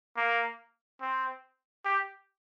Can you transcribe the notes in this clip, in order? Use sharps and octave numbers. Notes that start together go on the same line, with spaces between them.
A#3
C4
G4